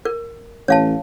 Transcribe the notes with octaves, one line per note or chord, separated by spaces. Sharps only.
A#4
A1 C#5 F5 A5